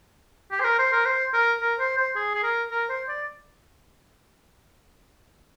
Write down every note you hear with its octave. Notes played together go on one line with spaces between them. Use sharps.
G4
C5
A#4
C5
A#4
C5
A#4
A#4
C5
C5
G#4
G#4
A#4
A#4
C5
D5